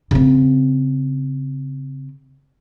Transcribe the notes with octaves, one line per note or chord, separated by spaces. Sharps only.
C#3 C4